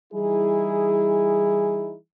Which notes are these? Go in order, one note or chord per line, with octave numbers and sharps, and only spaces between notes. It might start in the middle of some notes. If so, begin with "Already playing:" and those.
E3 G3 D#4 E4 G#4